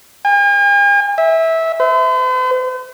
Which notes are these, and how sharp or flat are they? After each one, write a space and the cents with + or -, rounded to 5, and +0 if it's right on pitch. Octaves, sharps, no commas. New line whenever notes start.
G#5 -45
E5 -15
C5 -45